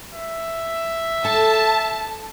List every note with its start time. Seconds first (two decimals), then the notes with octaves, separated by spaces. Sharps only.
0.14 E5
1.25 A4 A5